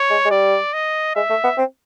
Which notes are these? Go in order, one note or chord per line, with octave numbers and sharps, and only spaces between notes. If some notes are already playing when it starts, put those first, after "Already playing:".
Already playing: C#5
G#3
G#3
G3 D5
D#5
G#3 E5
A3
B3
C4